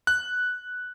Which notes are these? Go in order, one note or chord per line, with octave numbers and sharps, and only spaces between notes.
F#6